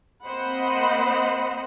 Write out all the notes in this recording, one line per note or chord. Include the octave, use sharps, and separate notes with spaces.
A#3 C4 C5 D#5 F#5 B5